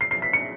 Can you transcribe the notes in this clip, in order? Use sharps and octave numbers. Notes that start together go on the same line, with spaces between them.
C7
C7
B6
C#7